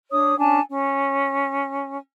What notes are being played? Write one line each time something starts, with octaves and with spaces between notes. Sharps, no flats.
D4 C#5 D#6
C#4 D4 G#5 A5
C#4